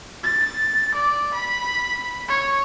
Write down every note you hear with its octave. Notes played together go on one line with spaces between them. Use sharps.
A6
D5
B5
C#5